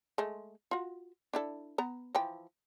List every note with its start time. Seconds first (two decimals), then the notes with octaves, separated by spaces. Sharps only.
0.18 G#3 A3
0.71 F4 F#4
1.33 D4 E4 A4
1.78 B3 A#5
2.15 E3 F3 G5